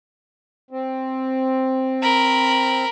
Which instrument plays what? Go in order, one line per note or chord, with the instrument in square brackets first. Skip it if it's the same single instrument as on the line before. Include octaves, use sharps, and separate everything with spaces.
[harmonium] C4
[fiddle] A#4 B5